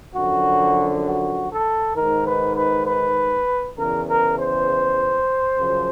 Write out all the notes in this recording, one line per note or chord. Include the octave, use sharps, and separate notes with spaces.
F#2 D3 F3 F#4
F#4
A4
G#2 D#3 A#4
B4
B4
B4
E2 C#3 E3 A#4
A#4
C5
F#2 C#3 F3